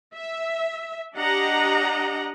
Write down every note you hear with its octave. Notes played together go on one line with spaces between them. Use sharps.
E5
D4 G4 D#5 F#5 A#5